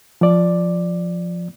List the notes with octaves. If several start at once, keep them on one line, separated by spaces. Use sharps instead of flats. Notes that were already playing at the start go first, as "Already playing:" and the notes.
F3 D5